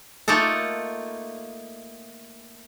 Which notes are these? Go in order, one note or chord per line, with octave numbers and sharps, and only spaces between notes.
A3 A#3 D#4 F4 A4